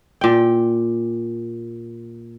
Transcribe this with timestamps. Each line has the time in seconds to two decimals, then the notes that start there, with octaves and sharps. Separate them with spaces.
0.21 A#2 G5